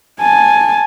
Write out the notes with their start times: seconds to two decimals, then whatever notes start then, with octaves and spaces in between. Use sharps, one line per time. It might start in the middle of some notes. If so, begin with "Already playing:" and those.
0.20 G#5 A5